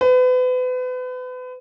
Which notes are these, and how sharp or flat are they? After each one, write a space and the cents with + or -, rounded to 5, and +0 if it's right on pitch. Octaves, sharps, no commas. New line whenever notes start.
B4 +35